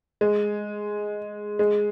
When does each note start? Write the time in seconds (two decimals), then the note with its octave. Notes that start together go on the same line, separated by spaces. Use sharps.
0.21 G#3
1.59 G#3